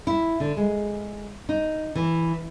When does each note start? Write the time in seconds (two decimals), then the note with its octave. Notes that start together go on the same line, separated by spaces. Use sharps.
0.07 E4
0.40 D3
0.57 G#3
1.49 D#4
1.95 E3